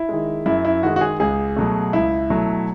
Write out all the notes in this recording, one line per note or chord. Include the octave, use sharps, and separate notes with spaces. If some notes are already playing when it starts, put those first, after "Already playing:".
Already playing: E4
D#3 G#3
F#2 E4
E4
D#3 G#3 F#4
F#4
G#4
C#2 G#4
B2 F#3 A3
C#2 E4
B2 F#3 A3